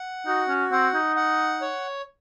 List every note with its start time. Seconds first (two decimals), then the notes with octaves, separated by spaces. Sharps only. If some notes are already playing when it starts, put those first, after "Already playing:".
Already playing: F#5
0.27 D#4 F#4
0.49 C#4
0.72 C4 F#5
0.94 D#4
1.16 F#5
1.62 C#5